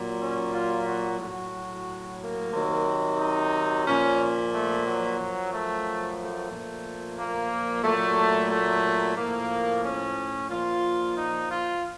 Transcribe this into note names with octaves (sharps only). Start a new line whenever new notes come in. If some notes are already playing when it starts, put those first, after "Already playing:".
Already playing: A#2 F#3
C#4
F4
F#4
A2 F#3 F#4
A#3
C3 D#3 F#3
D#4
A#2 F3 C#4
A3
F#3
F#2 F3
A3
A3
A#2 F3
A#3
A#2 F#3 A3
A3
A2 F3 A#3
C#4
A#2 F3 F4
D#4
F4